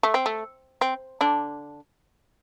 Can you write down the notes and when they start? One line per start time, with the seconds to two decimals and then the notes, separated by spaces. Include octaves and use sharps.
0.03 A3
0.14 C4
0.26 A3
0.81 C4
1.21 D3 D4